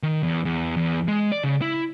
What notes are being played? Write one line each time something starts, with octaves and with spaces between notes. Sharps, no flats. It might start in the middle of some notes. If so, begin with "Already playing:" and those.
D#3
E2
E2
E2
G#3
D5
C#3
E4